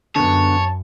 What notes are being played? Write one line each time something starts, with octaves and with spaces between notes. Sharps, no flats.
F#2 D3 B3 C#5 A5